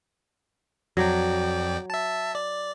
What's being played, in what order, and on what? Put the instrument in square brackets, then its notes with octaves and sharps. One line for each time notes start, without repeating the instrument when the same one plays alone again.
[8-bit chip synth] F2 D5 G5 [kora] F#3
[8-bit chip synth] E5 A5
D5